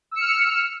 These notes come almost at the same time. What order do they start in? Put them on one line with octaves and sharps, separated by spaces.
E6 C#7 F6